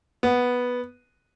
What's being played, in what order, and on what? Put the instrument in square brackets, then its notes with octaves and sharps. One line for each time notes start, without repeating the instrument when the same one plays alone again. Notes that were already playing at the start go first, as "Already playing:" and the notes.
[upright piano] B3